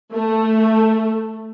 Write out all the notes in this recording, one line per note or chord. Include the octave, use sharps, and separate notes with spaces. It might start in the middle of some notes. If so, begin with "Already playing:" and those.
A3